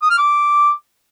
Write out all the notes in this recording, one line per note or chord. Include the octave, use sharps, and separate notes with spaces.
D#6
F6
D6